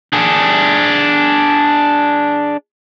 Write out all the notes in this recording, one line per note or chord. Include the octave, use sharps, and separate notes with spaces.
D4 G#4